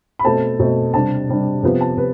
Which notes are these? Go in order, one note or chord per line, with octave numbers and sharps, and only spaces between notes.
B5
B2 A3 C4 A5
B2 A3 C4
C3 G3 D4 A5
C3 G3 D4
C3 F3 B3
A5
C3 B4